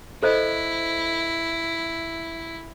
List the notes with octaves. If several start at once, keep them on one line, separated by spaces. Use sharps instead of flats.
E4 A4 C5 D#5